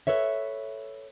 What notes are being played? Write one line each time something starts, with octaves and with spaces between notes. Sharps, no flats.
A4 B4 C#5 E5